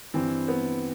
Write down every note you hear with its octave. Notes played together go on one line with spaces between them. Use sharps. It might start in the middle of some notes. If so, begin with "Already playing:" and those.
G2 E3 C4
B3